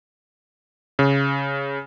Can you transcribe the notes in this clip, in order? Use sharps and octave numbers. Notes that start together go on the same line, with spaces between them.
C#3